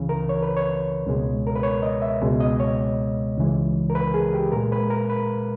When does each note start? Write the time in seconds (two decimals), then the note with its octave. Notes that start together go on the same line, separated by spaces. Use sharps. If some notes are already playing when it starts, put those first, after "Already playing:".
Already playing: C#2 C#3 E3
0.09 A#4
0.29 C#5
0.43 B4
0.57 C#5
1.06 C#2 B2 G#3
1.47 A#4
1.55 B4
1.63 C#5
1.83 D#5
2.02 E5
2.22 C#2 B2 G#3
2.40 D#5
2.60 C#5
3.38 C#2 C#3 E3 G#3
3.90 A#4
3.95 B4
4.14 G#4
4.34 G4
4.52 A#2 G#3 A#4
4.72 B4
4.90 A#4
5.10 B4